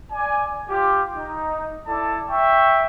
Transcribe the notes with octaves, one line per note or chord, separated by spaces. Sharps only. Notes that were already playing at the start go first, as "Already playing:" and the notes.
D5 G#5
F4 G4
D#4
E4 A4 D5 A5
E5 G5 C#6